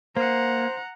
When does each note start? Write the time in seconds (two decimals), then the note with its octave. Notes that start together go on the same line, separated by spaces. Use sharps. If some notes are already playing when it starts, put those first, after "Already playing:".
0.17 A#3 C5 F#5 A#5